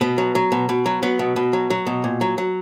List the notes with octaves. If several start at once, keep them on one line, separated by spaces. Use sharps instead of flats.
B2 B3
F#3
F#3
B2
B2
F#3
F#3 B3
B2
B2
F#3
F#3
B2
A#2
F#3
F#3